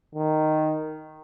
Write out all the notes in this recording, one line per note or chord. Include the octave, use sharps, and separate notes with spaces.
D#3